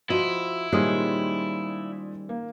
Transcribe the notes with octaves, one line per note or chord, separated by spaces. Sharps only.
F3 E4 F#4 C5 D#5
A#2 D#3 G3 G#3 C#4 G4 C5 D#6
A#3